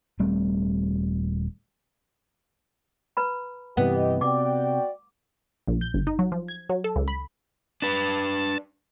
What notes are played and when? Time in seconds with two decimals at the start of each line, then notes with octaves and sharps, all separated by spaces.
0.19 D#1 G3 A3 C4
3.17 B4 A#5 B5
3.77 G2 C3 E3 B3 G4 D#5
4.21 C3 F#4 D5 G5 D6
5.68 A#1
5.81 G6
5.94 G1
6.07 D#4
6.19 F#3
6.32 F3
6.48 G#6
6.69 F#3
6.84 A4
6.96 C#2
7.08 B5
7.82 D4 B4 A5